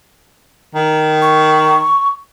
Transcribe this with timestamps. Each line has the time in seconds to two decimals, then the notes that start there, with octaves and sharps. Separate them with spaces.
0.75 D#3
1.22 C#6